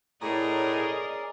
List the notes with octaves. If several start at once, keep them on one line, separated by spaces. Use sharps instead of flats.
A2 C#4 G#4 A#4 D5 D#5 A#5 D#6